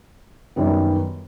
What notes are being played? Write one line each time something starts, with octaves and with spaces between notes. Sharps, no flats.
F#2 D#3 G3 B3